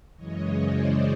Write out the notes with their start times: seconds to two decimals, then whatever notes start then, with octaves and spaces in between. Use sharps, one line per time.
0.16 F#2 C#3 E3 G#3 C#5 D#5
0.59 C5 D5